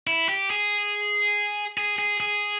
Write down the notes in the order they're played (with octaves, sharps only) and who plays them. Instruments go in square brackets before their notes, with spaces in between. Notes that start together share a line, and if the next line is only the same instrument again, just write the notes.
[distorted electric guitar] E4
G4
G#4
G#4
G#4
G#4